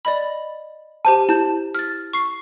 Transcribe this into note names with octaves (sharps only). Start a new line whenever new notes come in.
D5 D#5 B5
G4 C5 A5 D#7
E4 A5 G6
F6 A6
C#6 C7